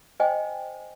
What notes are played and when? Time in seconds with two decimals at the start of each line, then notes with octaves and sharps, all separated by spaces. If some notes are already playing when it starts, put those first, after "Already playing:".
0.20 C5 D#5 G5 G#5